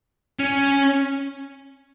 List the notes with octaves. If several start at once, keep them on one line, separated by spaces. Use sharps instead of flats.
C#4